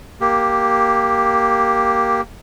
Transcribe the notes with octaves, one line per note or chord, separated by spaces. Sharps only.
A#3 G4